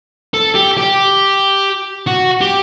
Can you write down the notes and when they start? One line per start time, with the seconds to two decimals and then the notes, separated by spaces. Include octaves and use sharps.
0.34 A4
0.55 G4
0.78 G4
2.07 F#4
2.41 G4